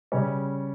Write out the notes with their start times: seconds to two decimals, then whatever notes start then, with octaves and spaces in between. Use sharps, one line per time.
0.12 C#3 G3 C#4